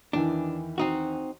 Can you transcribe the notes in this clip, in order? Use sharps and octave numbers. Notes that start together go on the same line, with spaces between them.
E2 D#3 E3 D4
C4 D#4 F#4